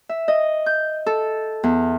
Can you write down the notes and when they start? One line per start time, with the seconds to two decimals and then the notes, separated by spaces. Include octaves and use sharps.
0.09 E5
0.28 D#5
0.66 G6
1.06 A4
1.64 E2